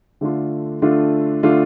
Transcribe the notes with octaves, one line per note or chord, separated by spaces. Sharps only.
D3 A3 D4 F4
D3 A3 D4 F4
D3 A3 D4 F4